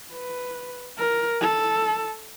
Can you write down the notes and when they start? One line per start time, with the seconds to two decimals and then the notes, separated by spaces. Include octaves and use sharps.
0.12 B4
0.98 A#4
1.41 A4